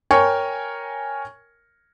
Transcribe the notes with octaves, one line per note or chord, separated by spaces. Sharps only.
A#4 C#5 G5 G#5 C#6